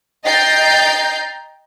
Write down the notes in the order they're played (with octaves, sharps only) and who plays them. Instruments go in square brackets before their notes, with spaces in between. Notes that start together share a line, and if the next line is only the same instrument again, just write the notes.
[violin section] D#5 G5 A#5 G6 A6 C7